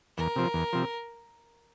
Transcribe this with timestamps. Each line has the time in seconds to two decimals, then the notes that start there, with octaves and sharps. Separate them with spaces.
0.17 E2 A#4
0.36 C3 F3
0.54 E2
0.73 C3 F3